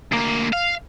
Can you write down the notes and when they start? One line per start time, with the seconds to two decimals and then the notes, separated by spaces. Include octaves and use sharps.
0.12 D2 A#3
0.53 F5